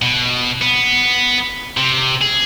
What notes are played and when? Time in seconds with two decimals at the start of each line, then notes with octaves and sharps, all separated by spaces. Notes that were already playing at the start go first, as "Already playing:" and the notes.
0.02 B2
0.61 B3
1.77 C3
2.22 G#4